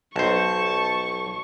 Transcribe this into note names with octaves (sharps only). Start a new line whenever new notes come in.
B1 C5 A5 C#6